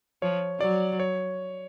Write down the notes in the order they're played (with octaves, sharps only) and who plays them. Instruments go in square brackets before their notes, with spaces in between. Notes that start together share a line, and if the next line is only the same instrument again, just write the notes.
[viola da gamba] F3 [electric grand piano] C#5
[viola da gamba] F#3 [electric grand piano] D5
[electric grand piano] C#5